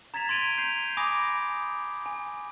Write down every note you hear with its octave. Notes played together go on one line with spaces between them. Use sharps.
A#5 G#6 A6 B6 E7 F7
C6 G#6 D7 D#7 F7 G7
G6 C7 F7
G#5 B5 D6 D#6 A#6 D7
G#5